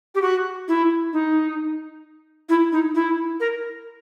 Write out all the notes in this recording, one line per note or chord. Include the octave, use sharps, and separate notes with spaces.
G4
F#4
E4
D#4
E4
D#4
E4
A#4